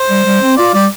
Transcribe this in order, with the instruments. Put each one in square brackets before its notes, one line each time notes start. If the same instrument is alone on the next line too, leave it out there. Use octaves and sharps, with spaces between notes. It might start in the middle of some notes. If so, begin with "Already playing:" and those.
Already playing: [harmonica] C5
[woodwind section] G3
G3
C4
[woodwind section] F4 [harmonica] D5
[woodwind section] G3 [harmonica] D5